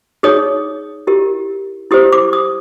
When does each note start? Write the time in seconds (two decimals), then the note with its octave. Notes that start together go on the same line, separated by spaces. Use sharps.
0.23 D#4 G#4 C#5 D#6
1.07 E4 G4 A#4
1.91 E4 G4 C5 D#6
2.12 D6
2.33 D#6